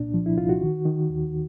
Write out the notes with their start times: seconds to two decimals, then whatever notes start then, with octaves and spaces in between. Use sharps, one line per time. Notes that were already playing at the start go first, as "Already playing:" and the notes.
Already playing: C2 A#2 D4
0.14 F3
0.26 E4
0.38 C2 F4
0.49 F#4
0.62 D#3
0.85 D#3
1.10 D#2